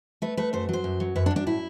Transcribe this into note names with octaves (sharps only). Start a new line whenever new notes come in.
A3 B4
A3 B4
F#2 C5
F#3 C5
F#2
F#3
F#2 B4
D4
F#2
D4
A2 E4